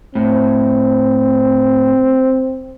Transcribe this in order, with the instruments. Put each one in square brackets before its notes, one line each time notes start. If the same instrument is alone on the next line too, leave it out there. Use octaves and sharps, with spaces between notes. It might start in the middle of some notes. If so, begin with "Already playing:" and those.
[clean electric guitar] A2 [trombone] C4